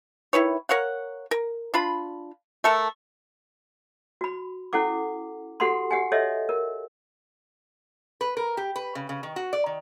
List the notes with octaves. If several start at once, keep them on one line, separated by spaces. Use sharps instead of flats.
D#3 E4 B4 C#5
A#4 C#5 F5 F#5
A#4
D4 F4 B5
A3 A4 A#4
F#4 B5
C#4 E4 A4 F#5 D6
F#4 G4 A4 F#5 B5 C6
G4 F#5 G#5
A4 C#5 D#5 E5
A#4
B4
A#4
G4
B4
C#3
C#3
D#3
F#4
D5
D#3